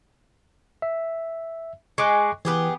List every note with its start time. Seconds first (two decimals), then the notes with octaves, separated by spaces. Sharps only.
0.82 E5
1.98 G#3 C#6 D6 F#6
2.45 E3 B3 G4 G#4